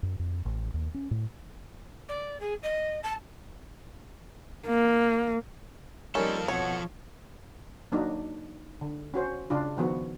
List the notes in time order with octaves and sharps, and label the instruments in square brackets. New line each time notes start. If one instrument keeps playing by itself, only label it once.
[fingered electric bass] F#2
F2
A1
D#2
C#4
A2
[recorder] D5
G#4
D#5
A5
[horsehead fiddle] A#3
[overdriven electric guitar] F3 A4 [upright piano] G3 A#3 D#4 [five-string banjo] C#4 [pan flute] A#4
[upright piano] B2 [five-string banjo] C#5 [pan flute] F#5
[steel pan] F#3 A#3 D4 D#4
D3
C#4 F#4 C5
C#3 D4 F4
D#3 F3 B3 F#4